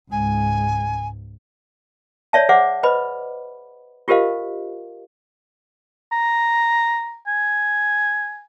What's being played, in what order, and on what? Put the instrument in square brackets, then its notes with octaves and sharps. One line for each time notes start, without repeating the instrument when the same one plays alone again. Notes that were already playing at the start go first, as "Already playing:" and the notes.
[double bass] C#2 G#2 [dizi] G#5
[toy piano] C#5 D5 E5 A5
G#4 C5 E5 F#5 D6
B4 C5 D#5 B5
F4 G4 A#4 C5 D#5 F5
[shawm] A#5
G#5